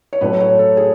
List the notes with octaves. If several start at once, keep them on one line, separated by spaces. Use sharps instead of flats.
C#5
A2 F#3 A3 C#4 B4
C#5
A4
G#4